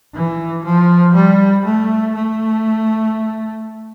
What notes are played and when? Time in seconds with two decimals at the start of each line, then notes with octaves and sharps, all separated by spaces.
0.14 E3
0.64 F3
1.15 G3
1.65 A3
2.15 A3